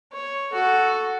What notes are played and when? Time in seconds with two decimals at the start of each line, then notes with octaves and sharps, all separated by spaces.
0.13 C#5
0.52 F#4 A4